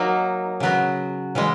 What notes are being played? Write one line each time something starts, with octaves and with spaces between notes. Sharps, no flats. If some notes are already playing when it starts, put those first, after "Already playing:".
Already playing: F#3 A#3 D#4
C#3 F#3 B3 F#4
C#3 E3 G#3